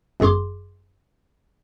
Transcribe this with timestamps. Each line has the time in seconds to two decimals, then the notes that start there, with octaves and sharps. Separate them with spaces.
0.20 G1 F#2 G#4 C6 D6